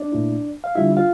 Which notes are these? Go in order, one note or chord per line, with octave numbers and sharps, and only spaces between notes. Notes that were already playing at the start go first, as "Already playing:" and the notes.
Already playing: D4 D5
A#2 A3 E4
F5
D3 G3 D4 E4 F4 E5
F4 F5